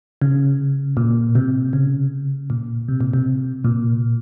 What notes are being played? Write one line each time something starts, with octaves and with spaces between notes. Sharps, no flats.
C#3
A#2
C3
C#3
A#2
C3
A#2
C3
A#2